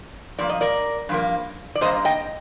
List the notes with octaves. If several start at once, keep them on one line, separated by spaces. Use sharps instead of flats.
G2 F3 A#3 D5
D#5
A#4 D5
G2 F3 A#3
D5
G2 F3 A#3 C5 D#5
D#5 G5